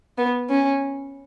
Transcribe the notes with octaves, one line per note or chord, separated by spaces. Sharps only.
B3
C#4